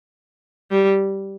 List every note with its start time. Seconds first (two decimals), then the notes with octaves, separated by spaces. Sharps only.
0.71 G3